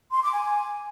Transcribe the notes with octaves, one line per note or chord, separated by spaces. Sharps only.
C6
D6
G#5